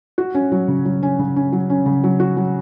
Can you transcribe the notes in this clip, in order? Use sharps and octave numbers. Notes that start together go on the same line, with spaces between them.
F#4
C#4
F#3
C#3
F#3
C#4
C#3
C#4
F#3
C#4
C#3
F#3
F#4
F#3